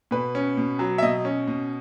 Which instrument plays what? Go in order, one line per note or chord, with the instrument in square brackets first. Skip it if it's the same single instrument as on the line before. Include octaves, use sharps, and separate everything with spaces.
[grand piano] B2 B4
C#4
B2
F#3
E5
B2 D#5
C#4
B2